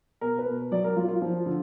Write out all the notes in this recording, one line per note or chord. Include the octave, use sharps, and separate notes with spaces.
B2 A#4
B4
B2
F#3 D5
A#4
F#3 F4
F4
F3
D3